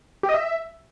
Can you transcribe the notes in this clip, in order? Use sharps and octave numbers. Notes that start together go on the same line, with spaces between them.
G4
D#5
E5